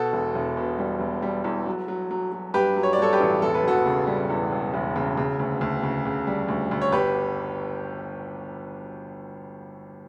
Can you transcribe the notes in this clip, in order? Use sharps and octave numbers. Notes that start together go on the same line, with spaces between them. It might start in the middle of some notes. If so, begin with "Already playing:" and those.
Already playing: B2 F#4 A4
E1
E1
B2
G3
E1
G3
E2
F#3
F#3
F#3
F#3
G2 G4 B4
F#3
C#5
D5
G2 A4 C#5
G4 B4
A1
E1 A4
B4
E1 F#4 A4
C#3
G3
E2
E1
E1
C#3
C#3
D2
D2
C#3
C#3
G3
D2
D2
C#5
G1 G4 B4